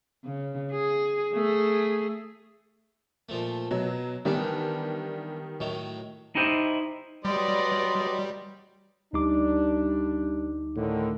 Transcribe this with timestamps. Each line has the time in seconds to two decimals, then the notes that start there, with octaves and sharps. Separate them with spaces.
0.24 C#3
0.71 G#4
1.33 A3 G#4
3.29 A#2 F3 A3
3.71 B2 F#3
4.25 D#3 E3 G3 B3 D4
5.60 A2 D#3 F#3
6.35 D#4 E4 G4 C5 D#5
7.25 F#3 G3 B4 D5 D#5 C6
9.13 D2 G3 D4 D#4 D6
10.76 A2 D3 D#3